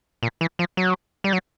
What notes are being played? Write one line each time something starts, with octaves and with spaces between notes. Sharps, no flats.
A#2
E3
F3
F#3
G3
F#3